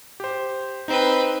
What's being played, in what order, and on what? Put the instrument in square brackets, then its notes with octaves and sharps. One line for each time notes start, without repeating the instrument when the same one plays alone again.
[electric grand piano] G4 C5
[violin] C4 B4 [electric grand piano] D#4